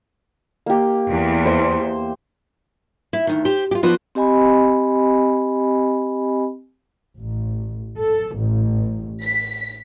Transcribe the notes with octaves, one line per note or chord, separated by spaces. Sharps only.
A#3 G4
E2
C5 E5
E4
D2 D#3
G4 C5
F4 G4
F3 B3 F4 F#4 B4 D5
C4 G4 D#5 G#5 B5
A1
A4
A1
B6